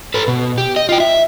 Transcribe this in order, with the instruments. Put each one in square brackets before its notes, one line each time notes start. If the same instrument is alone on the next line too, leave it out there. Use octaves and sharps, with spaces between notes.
[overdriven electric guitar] A4 B4
B2
G4
D#5
F4 G5
E5